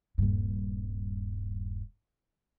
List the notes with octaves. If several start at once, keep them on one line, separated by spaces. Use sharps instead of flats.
D#1 G2